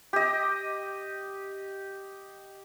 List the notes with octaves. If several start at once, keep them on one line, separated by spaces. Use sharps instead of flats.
G4 D#5